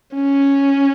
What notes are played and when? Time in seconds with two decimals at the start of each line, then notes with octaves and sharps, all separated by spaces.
0.15 C#4